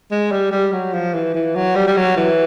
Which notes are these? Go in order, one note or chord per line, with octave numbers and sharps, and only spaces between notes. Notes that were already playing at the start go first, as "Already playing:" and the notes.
G#3
G3
G3
F#3
F3
E3
E3
F#3
G3
G3
F#3
E3